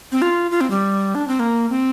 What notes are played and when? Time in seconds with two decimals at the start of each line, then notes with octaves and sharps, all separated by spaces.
0.12 C4
0.22 F4
0.51 F4
0.61 C4
0.70 G3
1.15 D4
1.28 C4
1.40 A#3
1.70 C4